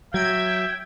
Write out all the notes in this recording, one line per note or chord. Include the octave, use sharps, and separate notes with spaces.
F#3 E5 G5 G#6